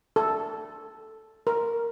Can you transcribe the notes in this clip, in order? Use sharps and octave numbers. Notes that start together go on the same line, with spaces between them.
A4
A#4